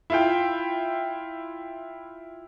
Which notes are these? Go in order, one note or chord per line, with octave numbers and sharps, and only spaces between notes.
E4 F4 G5